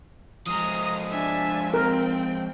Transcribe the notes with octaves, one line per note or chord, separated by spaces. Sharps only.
F3 G#3 A#5 D#6
D4 E5 G#5
C4 A#4 G5